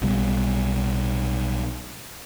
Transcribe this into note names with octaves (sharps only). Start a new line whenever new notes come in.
B1 B2 G3